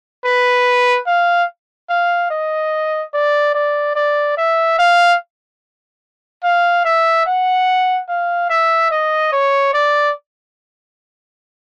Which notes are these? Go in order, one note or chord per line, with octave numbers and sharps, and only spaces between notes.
B4
F5
F5
D#5
D5
D5
D5
E5
F5
F5
E5
F#5
F5
E5
D#5
C#5
D5